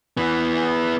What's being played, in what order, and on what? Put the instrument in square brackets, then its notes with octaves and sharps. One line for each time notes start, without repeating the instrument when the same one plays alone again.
[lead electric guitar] E3 B3